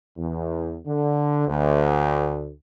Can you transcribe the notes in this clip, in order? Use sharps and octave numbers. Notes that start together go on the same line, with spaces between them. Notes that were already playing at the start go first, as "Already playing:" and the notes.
E2
D3
D2